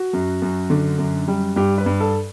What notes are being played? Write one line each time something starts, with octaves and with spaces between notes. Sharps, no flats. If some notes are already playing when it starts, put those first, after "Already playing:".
Already playing: F#4
F#2
F#2
D3
F#2
G3
G2 G4
B4
G2
A4